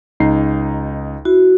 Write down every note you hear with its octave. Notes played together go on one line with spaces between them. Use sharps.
C#2 D#4 C7
E4 F#4